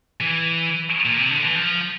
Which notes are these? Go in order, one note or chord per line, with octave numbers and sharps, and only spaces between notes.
E3
A#2
C3
D3
E3
F3